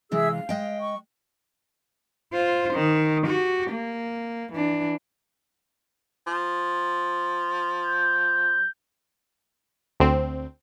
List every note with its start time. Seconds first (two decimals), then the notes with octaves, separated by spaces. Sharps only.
0.12 C3 E3 G#3 G#4 E5 E6
0.32 F5
0.49 G#3 D#5 G5
0.80 C#6
2.33 F4 C5
2.74 D#3
3.23 F#4 G4
3.71 A#3
4.53 E3 D4
6.27 F3
7.85 G6
10.00 D2 C4